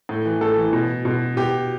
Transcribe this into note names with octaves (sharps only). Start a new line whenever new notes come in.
A2
E3
A2 A4
E3
B2
B2
B2 G4